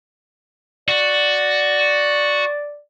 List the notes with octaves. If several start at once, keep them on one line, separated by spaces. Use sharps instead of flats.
F#4 D5